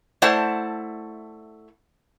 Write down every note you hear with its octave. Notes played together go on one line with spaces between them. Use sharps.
A3 E4 C5 D5 F#5 A5